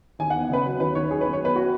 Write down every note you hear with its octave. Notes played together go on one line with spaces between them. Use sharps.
D#2 G#5
F#5
B3
C#3 B4
F#3
D#2 B4
D#2 C#5
F#2 G#4
B4
F#2
C#5
B3 B4
F#4